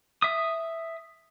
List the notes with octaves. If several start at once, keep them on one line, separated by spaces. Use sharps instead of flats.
E5 D#6